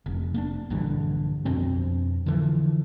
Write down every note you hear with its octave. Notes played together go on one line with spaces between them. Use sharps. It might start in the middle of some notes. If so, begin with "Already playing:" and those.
F1
A#3 B3 D4
A#1 G2 D3 E3
F2 B2 C4 D4
D3 E3 F3